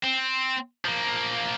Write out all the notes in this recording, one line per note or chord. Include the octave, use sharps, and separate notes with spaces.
C4
F3 A#3